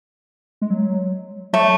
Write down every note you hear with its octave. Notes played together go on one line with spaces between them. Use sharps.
G#3
F#3
F#3 A3